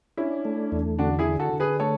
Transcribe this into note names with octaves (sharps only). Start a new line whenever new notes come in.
C#4 D4 E4
A3
E2
D3 D4 F#4
E4 G#4
D3
F#4 A4
D3
G#4 B4
A3 A4 C#5